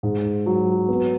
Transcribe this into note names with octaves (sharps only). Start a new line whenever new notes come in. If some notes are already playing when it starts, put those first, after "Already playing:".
G#2
F#3
B3